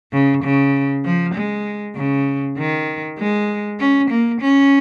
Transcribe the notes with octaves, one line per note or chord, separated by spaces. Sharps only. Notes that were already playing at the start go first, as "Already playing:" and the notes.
C#3
C#3
F3
G#3
C#3
D#3
G#3
C#4
A#3
C#4